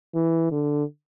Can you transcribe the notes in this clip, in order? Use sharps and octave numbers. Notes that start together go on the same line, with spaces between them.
E3
D3